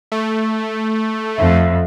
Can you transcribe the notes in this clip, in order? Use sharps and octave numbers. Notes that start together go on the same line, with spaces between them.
A3
F2 E5